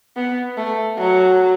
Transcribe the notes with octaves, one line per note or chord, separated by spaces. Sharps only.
B3
A3
F#3